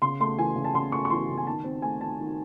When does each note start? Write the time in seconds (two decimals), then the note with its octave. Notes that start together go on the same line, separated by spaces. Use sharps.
0.02 C#3 C6
0.20 A3 C6
0.38 E3 G#5
0.56 C#3
0.64 A5
0.74 C#3 C6
0.92 A3 C#6
1.05 C#6
1.10 E3 C6
1.28 C#3
1.37 G#5
1.47 D#3 A5
1.64 C4
1.82 A3 G#5
2.01 D#3 A5
2.20 D#3